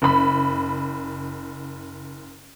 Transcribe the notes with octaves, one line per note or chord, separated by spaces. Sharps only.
F#1 B5